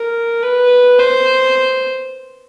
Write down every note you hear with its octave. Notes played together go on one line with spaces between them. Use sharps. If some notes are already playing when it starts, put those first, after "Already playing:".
Already playing: A#4
B4
C5